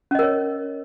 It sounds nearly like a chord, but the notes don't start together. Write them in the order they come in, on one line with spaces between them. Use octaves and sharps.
C#4 D#5 A#4 C#5